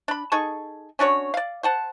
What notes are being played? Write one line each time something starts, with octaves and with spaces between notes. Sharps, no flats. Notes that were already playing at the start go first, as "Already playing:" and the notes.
D4 B5
D#4 G#4 A4 C#6
C#4 D4 F#4 C#5
D5 F5
C5 F#5 A5